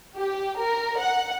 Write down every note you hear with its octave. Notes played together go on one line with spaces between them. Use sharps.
G4
A#4
F#5